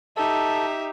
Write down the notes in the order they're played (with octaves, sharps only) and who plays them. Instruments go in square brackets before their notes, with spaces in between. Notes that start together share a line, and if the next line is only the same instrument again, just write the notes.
[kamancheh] D#4 G4 [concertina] A4 [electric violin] E5